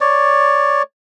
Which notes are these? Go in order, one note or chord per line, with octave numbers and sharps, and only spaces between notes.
C#5 D5